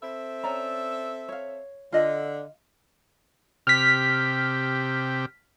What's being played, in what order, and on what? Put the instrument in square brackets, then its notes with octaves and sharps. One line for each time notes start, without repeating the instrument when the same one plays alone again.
[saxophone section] C4 A4 E5
[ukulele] C#4 D5 A#5
C#5 F5
[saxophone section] D3 [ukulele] F4 D#5
[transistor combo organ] C3 G4 [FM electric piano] F6 B6